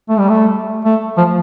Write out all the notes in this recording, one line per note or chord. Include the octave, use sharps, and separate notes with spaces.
A3
G3
A3
A3
F3